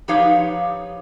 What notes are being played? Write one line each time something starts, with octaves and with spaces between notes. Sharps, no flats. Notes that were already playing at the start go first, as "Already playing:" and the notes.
F3 D#4 G4 B4 C#5 F5